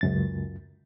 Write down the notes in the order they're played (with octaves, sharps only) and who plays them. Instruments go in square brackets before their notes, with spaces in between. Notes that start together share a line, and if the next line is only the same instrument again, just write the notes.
[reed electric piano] C#2 F#2 A6